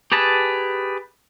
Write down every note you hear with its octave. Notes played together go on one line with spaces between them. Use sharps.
G4 G#4 B4 A5